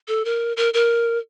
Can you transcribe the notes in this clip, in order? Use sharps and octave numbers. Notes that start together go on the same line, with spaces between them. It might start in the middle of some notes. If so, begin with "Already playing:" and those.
A4
A#4
A#4
A#4